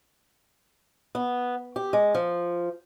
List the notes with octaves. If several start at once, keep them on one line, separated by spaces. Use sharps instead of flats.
B3
G4
G#3
F3